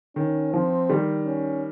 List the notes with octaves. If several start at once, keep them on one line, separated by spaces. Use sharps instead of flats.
D#3 C#4
F3 C4
D#3 G3
C#4